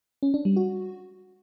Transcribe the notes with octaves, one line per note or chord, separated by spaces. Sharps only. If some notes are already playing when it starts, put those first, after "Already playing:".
C#4
D4
G3
F#4